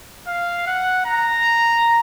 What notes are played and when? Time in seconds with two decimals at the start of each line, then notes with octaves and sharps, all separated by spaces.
0.27 F5
0.67 F#5
1.06 A#5